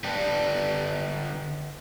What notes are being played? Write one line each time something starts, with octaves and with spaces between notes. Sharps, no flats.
D3 B4 D5 G5 A5